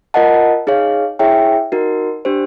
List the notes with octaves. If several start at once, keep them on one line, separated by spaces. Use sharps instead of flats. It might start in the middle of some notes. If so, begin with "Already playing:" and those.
F4 A#4 D#5 F#5 A5
D#4 G#4 C#5 F5
E4 G#4 C#5 E5 G5
D#4 F#4 A#4
D4 G4 C5